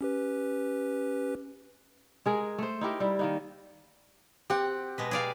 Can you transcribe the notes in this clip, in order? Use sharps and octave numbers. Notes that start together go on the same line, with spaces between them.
C#4 G4 B4
G#3 G#4 A#4
A3 C5
D#4 E4 G4 A#4
G3 E4
D#3 A#3 D#4
C4 G4 F#5
B2 G#3 B4
G#4 D5 F5